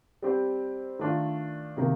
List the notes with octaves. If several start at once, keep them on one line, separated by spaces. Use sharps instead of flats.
G3 C4 G4 C5
D#3 A3 D4 F4
C3 D#3 A#3